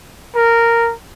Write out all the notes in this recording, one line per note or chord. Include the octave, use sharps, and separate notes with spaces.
A#4